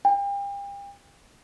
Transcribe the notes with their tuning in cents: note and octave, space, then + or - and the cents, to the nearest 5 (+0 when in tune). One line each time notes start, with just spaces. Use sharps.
G5 +40